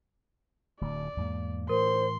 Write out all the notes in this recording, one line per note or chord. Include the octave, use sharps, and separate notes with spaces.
D1 D2 D5
E2 G#2 A#3
A2 E3 A#4 C5 C6